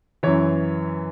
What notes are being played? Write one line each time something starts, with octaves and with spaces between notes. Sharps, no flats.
F#2 E3 C#5